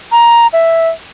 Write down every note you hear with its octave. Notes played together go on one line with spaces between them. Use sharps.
A#5
E5